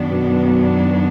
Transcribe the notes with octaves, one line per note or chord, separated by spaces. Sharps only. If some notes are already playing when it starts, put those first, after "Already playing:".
Already playing: F#2 D#3 F#3 B3 D4
B2